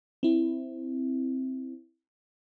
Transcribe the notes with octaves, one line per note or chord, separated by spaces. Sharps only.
C4 E4